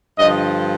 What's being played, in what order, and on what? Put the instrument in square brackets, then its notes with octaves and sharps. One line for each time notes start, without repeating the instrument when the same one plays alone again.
[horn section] G2 D3 F3 D#5